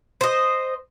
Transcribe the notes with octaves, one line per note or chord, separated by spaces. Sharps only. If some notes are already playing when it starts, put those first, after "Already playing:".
C5 D#5